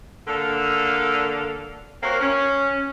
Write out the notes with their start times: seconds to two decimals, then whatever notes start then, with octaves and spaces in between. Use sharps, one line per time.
0.28 D3 A#3 A4 D5 F5
2.03 A#3 C4 F#4 A#4 C#5
2.21 C#4